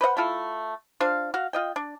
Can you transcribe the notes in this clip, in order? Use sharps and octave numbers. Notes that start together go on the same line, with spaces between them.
B4 C5 D#5 F#5
A3 E4 F4 A4
D4 F4 C5 F5
F#4 F5
F4 D#5 G5
D4